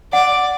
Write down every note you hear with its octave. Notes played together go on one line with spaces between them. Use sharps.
D5 F#5